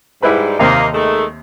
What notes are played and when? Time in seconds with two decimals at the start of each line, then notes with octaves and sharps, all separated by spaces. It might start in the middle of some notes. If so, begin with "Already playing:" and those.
0.22 G#2 G3 E4 B4 B5
0.59 D#2 C3 A#3 D#4
0.94 D#3 G#3 A3